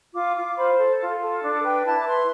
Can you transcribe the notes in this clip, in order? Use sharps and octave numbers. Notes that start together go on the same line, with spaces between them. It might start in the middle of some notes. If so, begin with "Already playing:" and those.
F4 D6
F4 D6
C5 B5
A4
F4
A4
D4
B4 G5
E4 A5
D6
B4 C6